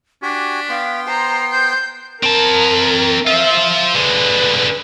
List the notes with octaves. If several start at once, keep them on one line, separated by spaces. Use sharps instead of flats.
D4 F#4 G4 G#5 B6
B3 F5 G5 C6
C5 A#5 C7
C5 G6
C4 A#4 A5
F4 C5 E5
D3 G#3 B4